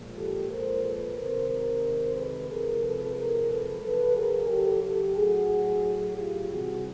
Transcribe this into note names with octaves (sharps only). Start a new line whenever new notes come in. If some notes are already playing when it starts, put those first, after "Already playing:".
Already playing: A#2 F3 G#3
G4 A4
A#4 C5
A4 B4
C3 D#3 G#3 A#4 C5
A#4 C5
A4 B4
C3 F3 G#3 G#4 A#4
A4 B4
G#4 A#4
A4 B4
C#3 F#3 A4 B4
G#4 A#4
G4 A4
G4 A4
A2 F#3 F#4 G#4
F4 G4
C3 E3 G3 F#4 G#4